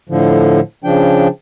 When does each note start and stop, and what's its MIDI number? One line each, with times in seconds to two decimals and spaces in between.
0.10 0.60 45
0.10 0.60 50
0.10 0.60 53
0.84 1.28 49
0.84 1.28 53
0.84 1.28 62
0.84 1.28 79